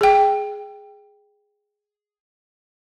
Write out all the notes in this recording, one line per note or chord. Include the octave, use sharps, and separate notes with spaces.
G#4 G5